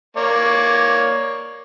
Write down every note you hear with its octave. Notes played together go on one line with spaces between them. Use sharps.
A#3 C#5 D5